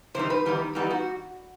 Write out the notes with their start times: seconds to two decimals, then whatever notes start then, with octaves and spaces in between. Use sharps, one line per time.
0.14 C3 E3 G3 D#4 C5
0.30 B4
0.46 E3 G3 B3 D#4
0.75 E3 G3 B3 D#4
0.90 F#4